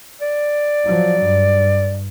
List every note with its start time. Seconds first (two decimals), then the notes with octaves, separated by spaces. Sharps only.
0.22 D5
0.86 F3 F#3
1.22 G2